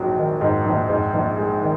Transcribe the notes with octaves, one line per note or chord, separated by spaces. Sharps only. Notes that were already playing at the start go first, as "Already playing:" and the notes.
Already playing: A#1 G#2 F#3
D#3
G#2
A#1
G#2
A#1
G#3
D#3